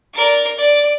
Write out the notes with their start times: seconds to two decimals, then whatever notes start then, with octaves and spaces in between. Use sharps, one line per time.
0.14 A#4 D5
0.57 D5